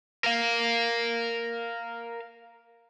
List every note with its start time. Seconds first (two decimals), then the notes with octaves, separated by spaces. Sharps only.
0.24 A#4 F5